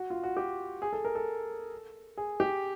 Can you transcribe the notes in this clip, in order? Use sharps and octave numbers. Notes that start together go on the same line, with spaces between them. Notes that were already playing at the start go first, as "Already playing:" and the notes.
Already playing: F#4
F4
F#4
G4
G#4
A4
A#4
A4
G#4
G4